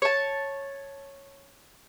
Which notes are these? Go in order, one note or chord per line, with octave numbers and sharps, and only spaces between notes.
C#5 A5